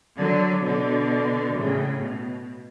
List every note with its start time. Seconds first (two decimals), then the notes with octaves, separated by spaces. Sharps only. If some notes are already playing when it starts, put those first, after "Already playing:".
0.17 D3 F#3
0.63 B2 D3
1.56 A2 C#3
2.02 B2